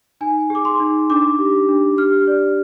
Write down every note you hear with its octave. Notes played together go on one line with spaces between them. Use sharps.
D#4 G#5
G#4 D6
C6
D#4
D4 D6
G4
D4
G4 F6
D5